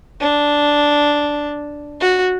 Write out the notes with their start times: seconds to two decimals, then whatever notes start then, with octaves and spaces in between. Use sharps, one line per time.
0.21 D4
2.01 F#4